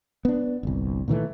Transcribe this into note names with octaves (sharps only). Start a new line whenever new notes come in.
B3 D4
G1 C2
A#2 D#3 E3 A3